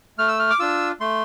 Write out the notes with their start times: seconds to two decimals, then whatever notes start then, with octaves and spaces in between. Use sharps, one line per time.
0.18 A3 F6
0.28 E6
0.39 F6
0.50 D6
0.59 D4 F4 E6
1.00 A3 C6